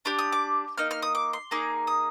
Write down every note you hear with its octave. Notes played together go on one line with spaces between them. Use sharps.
D4 G4 D6
D#6
D6
A#3 D#4 F6
F6
D#6
D6
C6
A#3 D#4 G#4 D6
D#6